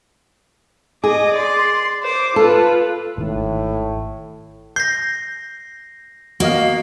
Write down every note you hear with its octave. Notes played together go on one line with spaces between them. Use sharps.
G#4 D#5 D6
D5 C6
C5 D6
F4 A4 B4
G#1 A2 D#3
G6 A#6 C7
A#3 F#4 D#5 F5